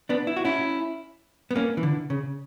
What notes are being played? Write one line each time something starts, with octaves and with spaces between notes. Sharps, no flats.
B3 D4
E4
F#4
C#4 E4
B3
A#3 C#4
E3
D3
C#3